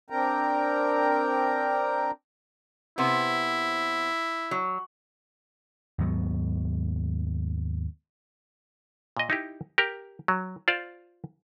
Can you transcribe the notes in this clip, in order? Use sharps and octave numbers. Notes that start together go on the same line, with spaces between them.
C4 D4 A#4 G5 A#5
C3 B3 E4 C5
F#3
D#2 G#2 F#3 B3
A#2 D#5
D#4 E4 G4
G4 A#4
F#3
F4 C5 D5 F5